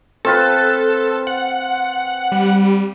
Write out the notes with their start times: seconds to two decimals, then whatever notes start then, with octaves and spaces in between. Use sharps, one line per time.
0.25 C4 F4 A4 B4
1.27 F#5
2.32 G3